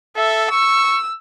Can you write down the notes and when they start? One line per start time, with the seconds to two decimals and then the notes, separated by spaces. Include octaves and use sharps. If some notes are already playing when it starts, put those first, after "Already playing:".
0.16 A4 E5
0.51 C#6 E6